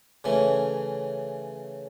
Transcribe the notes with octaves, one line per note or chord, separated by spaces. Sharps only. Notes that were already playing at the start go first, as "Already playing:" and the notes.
C#3 E3 A3 C#4